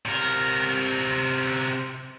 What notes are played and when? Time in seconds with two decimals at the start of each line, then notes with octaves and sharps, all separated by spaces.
0.06 C3 A#4